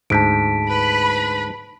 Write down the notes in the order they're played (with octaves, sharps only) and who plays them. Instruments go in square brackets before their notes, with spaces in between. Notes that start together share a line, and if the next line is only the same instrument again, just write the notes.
[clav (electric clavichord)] D2 G#2 [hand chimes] A5 B6 D7
[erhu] B4 [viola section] B5